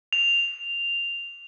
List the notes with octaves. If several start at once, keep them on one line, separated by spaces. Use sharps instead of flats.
F7